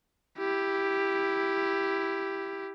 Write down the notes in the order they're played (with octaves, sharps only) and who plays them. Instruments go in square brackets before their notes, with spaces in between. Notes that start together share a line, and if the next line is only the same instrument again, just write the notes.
[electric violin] E4 G4